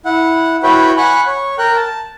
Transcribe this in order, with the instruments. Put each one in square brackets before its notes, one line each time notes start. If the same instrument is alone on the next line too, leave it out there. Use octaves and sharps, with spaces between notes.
[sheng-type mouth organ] E4 F#5
E4 F#4 B4 C#5 G5 B5
F#5 G#5 B5 C#6 F#6
C#5
A#4 G5 F#6
A5